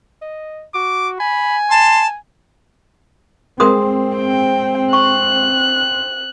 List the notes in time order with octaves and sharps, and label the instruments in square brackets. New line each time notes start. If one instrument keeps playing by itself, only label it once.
[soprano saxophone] D#5
[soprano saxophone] F#4 [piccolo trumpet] D6
[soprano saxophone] G#5 [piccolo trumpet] B5
[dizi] A5 [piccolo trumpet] C6
[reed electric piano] G#3 G#4 [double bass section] C4 [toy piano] A#4 C6 D#6
[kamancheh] G5
[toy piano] C#6 [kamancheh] F#6